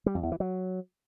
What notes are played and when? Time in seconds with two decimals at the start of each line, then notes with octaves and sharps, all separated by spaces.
0.06 G3
0.15 F2
0.23 E2
0.32 E3
0.40 F#3